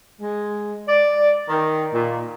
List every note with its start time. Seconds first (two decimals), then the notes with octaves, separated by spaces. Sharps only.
0.20 G#3
0.87 D5
1.49 D#3
1.93 A#2